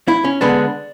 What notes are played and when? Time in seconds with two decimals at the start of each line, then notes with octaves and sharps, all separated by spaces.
0.08 E4
0.24 C#4
0.41 D3 G#3 B3 D4